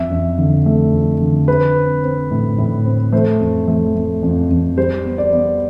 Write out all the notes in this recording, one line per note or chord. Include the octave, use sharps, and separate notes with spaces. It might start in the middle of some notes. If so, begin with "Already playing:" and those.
Already playing: F2 E5
F2
D3
A3
F2
D3
C4 B4
C4
C4
A2
A2
C4
A3 C5
F2
A3
A3
F2
F2
G3 C5
B3
D5
B3